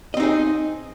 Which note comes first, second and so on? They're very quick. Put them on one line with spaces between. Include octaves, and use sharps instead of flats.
D#5 C4 D#4 G#4